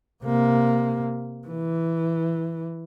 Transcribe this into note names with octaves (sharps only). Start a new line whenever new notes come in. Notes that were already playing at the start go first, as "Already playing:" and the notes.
C3 A#3
E3